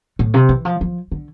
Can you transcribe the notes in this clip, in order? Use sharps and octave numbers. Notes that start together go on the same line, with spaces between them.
A2
C3
E3
F3
F3
D3